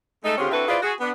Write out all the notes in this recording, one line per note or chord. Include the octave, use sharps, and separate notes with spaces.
G#3 A3 D#4 A4
D3 C4 C#4 F4 G4 G#4
C4 D4 E4 F#4 A4 B4
E4 F4 G#4 B4 C5 D5
F#4 G#4
B3 D4